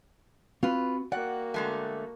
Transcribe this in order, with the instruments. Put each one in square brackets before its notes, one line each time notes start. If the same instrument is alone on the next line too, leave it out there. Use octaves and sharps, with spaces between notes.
[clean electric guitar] C4 F#4 [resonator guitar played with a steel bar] F4 B4
[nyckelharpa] A#3 F#4 [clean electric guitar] D5 G5 [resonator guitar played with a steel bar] F#5
[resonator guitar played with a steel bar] D3 G#3 A3